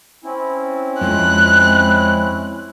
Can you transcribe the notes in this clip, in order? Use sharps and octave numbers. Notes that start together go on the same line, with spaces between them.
C4 C#4 E4
F2 G#3 F#6